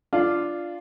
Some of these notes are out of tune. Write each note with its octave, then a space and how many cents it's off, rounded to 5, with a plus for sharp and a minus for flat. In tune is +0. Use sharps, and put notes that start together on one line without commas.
D4 +0 F4 -10